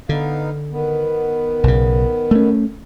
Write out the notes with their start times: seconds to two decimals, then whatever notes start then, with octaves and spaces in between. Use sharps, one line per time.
0.09 D3 B3 D#4 F5
0.72 D#3 B3
1.63 B1 C#3
2.31 A3 C#4